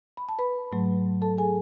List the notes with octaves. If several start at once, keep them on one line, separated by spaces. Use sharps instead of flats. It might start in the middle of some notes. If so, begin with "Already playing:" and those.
B5
A5
B4 B5
G#2 F#3 A3
A4 A5
G#4 G#5